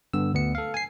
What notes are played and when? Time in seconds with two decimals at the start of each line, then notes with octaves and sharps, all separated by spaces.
0.13 G2 D3 B3 E6
0.34 D2 B3 C#7
0.55 A4 F5
0.74 G#5 C7